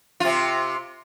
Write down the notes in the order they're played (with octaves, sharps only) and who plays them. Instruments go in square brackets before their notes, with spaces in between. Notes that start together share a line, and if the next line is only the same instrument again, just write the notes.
[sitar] C3 F4